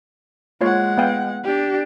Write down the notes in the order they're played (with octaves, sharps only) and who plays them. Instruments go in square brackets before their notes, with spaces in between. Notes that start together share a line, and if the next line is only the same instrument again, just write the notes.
[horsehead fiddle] G#3 F#5 [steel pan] A#3 F4 C#5
[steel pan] B3 F5 G5
[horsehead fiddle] D4 G4